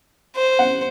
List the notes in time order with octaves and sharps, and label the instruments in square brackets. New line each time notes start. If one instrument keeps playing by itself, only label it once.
[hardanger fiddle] C5
[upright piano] F#5